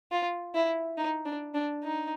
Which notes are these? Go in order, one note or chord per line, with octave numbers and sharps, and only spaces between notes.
F4
E4
D#4
D4
D4
D#4